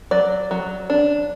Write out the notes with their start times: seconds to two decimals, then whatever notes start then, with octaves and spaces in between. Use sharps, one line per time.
0.11 F#3 D5
0.51 F#3
0.90 D4